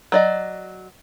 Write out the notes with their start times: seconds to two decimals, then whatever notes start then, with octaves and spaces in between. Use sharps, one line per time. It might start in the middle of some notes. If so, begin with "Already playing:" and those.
0.12 F#3 D5 D#5